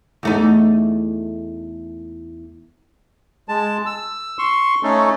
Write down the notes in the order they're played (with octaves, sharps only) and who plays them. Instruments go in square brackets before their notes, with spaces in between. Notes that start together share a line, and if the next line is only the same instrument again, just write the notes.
[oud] E2 A3 D#4
[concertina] G#3 A5
E6
C6 C#6
A3 C#4 D#4 A4